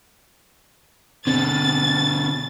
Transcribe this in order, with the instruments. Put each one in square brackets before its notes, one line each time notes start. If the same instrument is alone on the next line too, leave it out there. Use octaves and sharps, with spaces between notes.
[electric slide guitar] B2 D3 [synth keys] C4 [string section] A6